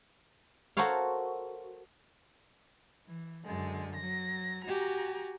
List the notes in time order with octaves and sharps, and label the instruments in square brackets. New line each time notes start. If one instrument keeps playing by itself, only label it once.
[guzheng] F#4 A4 A#4 C5 C#5 F5
[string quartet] E3
F#2 D3 G#3
F#3 A#6
F#4 G4 G#5 A#5